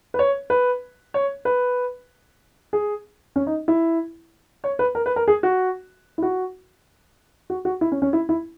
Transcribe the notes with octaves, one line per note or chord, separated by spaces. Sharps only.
B4
C#5
B4
C#5
B4
G#4
C#4
D#4
E4
C#5
B4
A#4
B4
A#4
G#4
F#4
E4
F#4
F#4
F#4
E4
C#4
C#4
E4
E4